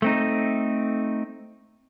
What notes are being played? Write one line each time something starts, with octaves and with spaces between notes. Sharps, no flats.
A3 C4 D#4